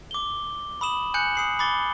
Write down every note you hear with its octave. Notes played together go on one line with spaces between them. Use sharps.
D6 G7
B5 D#6 E7 F#7
G#5 F#6 G6 C#7 F#7
D#6 C7 F#7
B5 D6 A6 G7